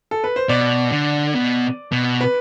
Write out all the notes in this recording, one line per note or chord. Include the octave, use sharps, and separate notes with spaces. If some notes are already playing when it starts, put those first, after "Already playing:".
A4
B4
C5
B2 D5
D3
B2
B2
B4